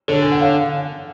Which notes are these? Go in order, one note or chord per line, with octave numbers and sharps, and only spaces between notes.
D3 A4 C#5
G#5
F#5
C#5 F5